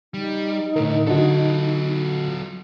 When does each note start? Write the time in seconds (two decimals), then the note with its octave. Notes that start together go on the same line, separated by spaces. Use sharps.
0.14 G3 D#4
0.76 D2 A2 D3 A#4
1.07 D3 F#3 F4 F#4 A4